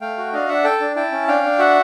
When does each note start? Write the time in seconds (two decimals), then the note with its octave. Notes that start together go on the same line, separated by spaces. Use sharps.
0.01 A3 F5 G5
0.18 F#4
0.33 D4 D#5 F5
0.49 D4 E5 F#5
0.64 A4 G5 A5
0.80 D4
0.96 E4 G5 A5
1.12 C#4
1.28 D4 F5 G5
1.43 D4
1.59 F#4 E5 F#5